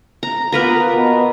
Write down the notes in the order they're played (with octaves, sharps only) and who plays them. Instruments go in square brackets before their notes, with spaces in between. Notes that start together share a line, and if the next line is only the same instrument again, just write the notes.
[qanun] A#5
[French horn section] A#3 B3 F4 [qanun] A#4 B4 A#5
[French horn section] B2 B3